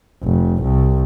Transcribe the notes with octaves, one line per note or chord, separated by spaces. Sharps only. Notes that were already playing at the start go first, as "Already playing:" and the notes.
F1
C2